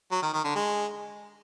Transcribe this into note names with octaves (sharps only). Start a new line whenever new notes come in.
F#3
D#3
D#3
D3
G#3